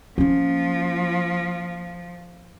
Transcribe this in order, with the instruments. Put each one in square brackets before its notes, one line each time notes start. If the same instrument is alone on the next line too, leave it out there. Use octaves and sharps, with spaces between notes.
[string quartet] F3 [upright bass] A#3 C#4